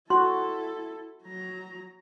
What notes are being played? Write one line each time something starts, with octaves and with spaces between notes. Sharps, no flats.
E4 F#4 A4 C6
F#3 A#5